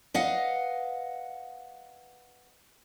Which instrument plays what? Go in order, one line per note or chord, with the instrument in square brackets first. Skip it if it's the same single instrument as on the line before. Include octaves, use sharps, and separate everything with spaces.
[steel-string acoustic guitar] B4 D#5 F5 F#5